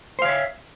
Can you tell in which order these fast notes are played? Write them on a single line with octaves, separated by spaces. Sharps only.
C5 F5 C#5 E5